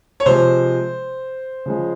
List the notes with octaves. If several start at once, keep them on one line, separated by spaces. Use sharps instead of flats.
C#5
C3 F3 G#3 C5
C#3 F3 G#3